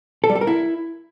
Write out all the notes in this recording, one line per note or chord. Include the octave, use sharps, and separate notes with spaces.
A4
G3
A4
A#4
E4